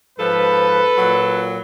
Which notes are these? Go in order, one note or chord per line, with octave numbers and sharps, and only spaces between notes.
G#2 F3 A4 B4
A#2 F#3